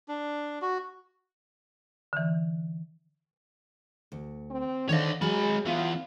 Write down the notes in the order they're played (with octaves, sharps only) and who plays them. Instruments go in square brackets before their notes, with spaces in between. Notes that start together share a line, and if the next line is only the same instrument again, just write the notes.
[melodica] D4
F#4
[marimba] D3 E3
[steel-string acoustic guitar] D2
[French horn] C4
[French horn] D3 [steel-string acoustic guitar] D#3 D4 C5 [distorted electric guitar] C#5 D#5
[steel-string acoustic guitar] F#3 G4 [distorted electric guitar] G#3 B5 [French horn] G#4
[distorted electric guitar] E3 B3 [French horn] F4